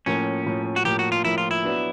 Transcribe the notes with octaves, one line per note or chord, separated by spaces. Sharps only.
A2 F3 A#3 C#4
A2 F3 A#3
F#4
A2 F3 A#3 G4
F#4
F4
A2 F3 A#3 E4
F4
E4
F#3 B3 D4